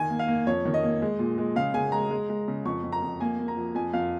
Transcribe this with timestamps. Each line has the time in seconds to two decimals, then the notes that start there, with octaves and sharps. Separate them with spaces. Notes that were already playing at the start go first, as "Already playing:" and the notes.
Already playing: D#3 G#5
0.10 A#3
0.19 F5
0.28 A#3
0.46 F2 C#5
0.65 D#3
0.74 D#5
0.83 A#3
1.02 G#3
1.19 A#2
1.38 G#3
1.56 C#3 F5
1.74 C#3 G#5
1.92 G#3 A#5
2.11 G#3
2.29 G#3
2.48 C#3
2.65 F2 C#6
2.83 F2
2.92 A#5
3.02 F2
3.20 A#3 G#5
3.39 A#3
3.48 A#5
3.57 F3
3.75 F2 G#5
3.93 F2 F5